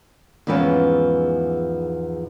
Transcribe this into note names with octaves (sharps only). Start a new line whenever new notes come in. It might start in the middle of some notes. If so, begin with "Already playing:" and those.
E2 G#2 E3 F3 B3 C#4